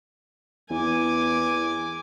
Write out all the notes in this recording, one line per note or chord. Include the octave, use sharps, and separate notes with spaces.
E2 G#5 D6